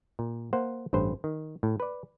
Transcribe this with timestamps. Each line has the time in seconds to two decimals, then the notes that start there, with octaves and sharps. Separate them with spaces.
0.19 A#2
0.53 A#3 C5 F#5
0.93 A1 G2 B4 C5
1.24 D#3
1.63 A2
1.80 B4 D5